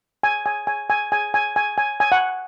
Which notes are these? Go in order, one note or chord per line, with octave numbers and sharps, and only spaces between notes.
G#5
G#5
G#5
G#5
G#5
G#5
G#5
G#5
G#5
F#5